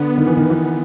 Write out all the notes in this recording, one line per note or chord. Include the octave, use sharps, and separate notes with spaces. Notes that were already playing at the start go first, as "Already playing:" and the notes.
Already playing: D3 B3
D#3
E3
D#3
E3